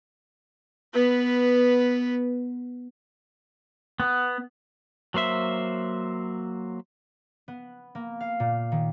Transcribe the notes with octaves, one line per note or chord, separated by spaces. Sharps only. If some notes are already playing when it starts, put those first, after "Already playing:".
B3 B4
B3
F#3 A#3 C5 E5
B3
A#3
F5
A#2
D#3